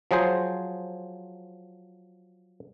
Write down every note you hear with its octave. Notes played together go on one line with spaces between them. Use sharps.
F3 F#3 G#4 C5